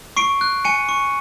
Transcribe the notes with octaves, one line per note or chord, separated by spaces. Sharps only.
C#6 C7 D7
F#6
G#5 C#7 D#7
C#6